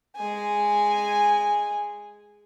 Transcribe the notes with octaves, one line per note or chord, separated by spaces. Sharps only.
G#3 G#5